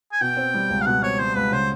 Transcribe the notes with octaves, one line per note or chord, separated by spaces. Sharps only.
G#5
B2 G5
C4
G3
C#2
F5
B2 F#5
C4 C#5
G3 C5
C#2 B4
C#3 C5